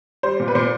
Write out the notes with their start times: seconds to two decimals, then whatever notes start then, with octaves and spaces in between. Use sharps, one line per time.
0.23 G3 C5
0.40 A#2
0.48 B4
0.55 A#2 C5